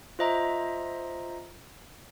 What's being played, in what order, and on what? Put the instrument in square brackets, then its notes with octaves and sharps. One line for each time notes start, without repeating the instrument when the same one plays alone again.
[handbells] F4 C5 D#5 E5 A#5